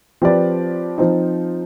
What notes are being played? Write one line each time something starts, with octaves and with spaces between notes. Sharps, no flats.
F3 C4 G4 B4 D5
F3 C4 D#4